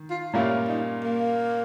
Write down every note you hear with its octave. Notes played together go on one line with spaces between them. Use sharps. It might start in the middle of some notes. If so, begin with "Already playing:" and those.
Already playing: D#3
F4
A#2 G3 A#3 C#4 E4 F4
D#4
A#3